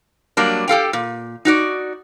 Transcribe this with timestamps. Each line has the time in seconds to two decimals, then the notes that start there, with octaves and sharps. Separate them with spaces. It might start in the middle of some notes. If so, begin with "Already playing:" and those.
0.37 F#3 G3 A#3 D4
0.68 G4 A4 F5 G5
0.93 A#2
1.45 D#4 F#4 D5